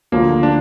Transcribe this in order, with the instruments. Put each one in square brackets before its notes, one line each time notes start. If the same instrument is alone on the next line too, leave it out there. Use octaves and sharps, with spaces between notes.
[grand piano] D2 D3 F3 [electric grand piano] A#3
[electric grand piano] D4